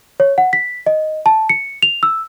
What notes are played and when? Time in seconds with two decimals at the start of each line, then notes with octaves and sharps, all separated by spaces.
0.20 C#5
0.38 F#5
0.53 B6
0.86 D#5
1.26 A5
1.49 C#7
1.82 F7
2.03 E6